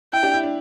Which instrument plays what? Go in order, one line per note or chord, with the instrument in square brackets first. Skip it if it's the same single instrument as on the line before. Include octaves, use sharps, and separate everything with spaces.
[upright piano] E4 [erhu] G5
[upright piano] D4 G4
E4
D4